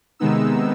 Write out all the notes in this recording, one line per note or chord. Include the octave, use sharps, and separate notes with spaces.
C3 D#3 G#3 B3 D#4 E6